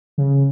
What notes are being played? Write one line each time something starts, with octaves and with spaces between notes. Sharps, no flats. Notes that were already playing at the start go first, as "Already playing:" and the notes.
C#3